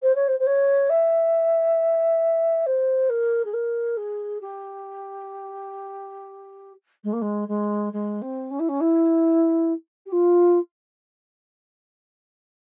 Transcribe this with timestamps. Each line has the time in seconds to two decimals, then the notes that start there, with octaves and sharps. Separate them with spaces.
0.02 C5
0.15 C#5
0.28 C5
0.39 C5
0.46 C#5
0.90 E5
2.66 C5
3.09 A#4
3.45 G#4
3.53 A#4
3.97 G#4
4.41 G4
7.04 G#3
7.13 A#3
7.21 G#3
7.48 G#3
7.93 G#3
8.22 C4
8.50 C#4
8.59 E4
8.69 C#4
8.80 E4
10.06 G4
10.12 F4